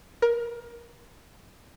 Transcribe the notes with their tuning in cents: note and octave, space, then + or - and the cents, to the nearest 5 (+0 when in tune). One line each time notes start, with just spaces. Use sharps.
A#4 +20